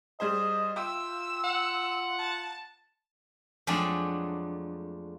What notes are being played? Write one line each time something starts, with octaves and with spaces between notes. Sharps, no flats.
G3 G#4 C5 D#5
F4 E5 G5 E6
F#5
A5
F2 F#3 G#3 A3 D4